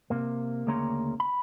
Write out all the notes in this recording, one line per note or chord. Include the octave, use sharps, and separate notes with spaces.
C3 A#3
D2 C#3 A#3 C#5 A#5 C6
B5